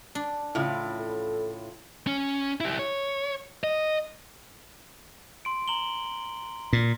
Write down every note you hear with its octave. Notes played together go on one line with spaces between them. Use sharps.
D4
A2 C#3 E4 F4
A4
C#4
E4 G4
C#5
D#5
C6 D7
A#5 F#7 G7
A#2